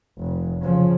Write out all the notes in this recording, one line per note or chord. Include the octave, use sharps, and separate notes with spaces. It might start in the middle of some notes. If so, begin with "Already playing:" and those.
F1
C#3 F3